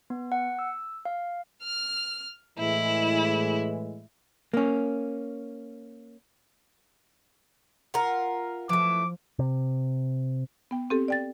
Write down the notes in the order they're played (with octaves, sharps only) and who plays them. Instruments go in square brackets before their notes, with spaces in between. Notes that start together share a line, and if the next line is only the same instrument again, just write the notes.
[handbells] B3
F#5
E6
F5
[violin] F6
[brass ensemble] A2 E3 G#3 [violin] E4
[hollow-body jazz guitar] A#3 C#4
[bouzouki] F4 A#4 [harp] F#5
[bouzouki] E3 A3 [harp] F3 [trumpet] D6
[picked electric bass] C3
[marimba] B3 G5
C4 G4 A4
D5 G5 A6